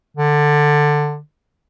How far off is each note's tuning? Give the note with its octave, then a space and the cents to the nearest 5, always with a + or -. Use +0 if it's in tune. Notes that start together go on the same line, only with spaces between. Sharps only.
D3 +10